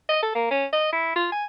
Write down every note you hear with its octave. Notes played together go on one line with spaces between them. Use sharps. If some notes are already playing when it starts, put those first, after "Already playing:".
D#5
A4
A#3
C#4
D#5
E4
F4
G#5